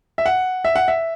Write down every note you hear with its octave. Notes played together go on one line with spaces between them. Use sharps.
E5
F#5
E5
F#5
E5